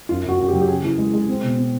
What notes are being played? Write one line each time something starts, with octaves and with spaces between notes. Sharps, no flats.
F#2 F4
F#2 F#4
F#2 F#4
G4
F#3
G4
C#3 G#4
E3
G#3
G#3
C4
B2
C4